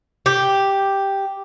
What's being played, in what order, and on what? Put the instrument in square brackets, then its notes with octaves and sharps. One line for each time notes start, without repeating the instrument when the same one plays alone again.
[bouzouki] G4